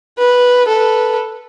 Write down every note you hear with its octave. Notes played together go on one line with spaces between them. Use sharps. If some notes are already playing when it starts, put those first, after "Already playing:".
B4
A4 B4